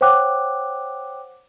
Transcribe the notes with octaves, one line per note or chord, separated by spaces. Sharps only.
C5 C#5 F#5 G5 D6 F#6